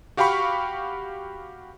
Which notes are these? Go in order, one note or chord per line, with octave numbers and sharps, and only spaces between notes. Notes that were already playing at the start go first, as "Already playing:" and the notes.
F#4 G4 F5 G5 B5 C#6